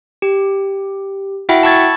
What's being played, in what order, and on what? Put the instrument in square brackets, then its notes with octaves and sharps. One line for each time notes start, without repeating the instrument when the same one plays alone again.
[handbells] G4
E4 F#4 E5 F#5 G5 B5
A5 B5 C#6 E6 G#6 A6